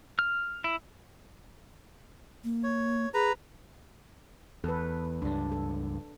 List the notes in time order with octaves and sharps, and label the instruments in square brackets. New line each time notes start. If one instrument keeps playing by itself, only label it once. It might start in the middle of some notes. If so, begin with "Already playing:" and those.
[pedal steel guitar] F6
E4
[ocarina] A#3
[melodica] C#5
[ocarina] G#4 [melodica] B4 A#5
[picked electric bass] E2 [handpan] A4 B4
[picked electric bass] C#2 G2 [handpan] D4
[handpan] A4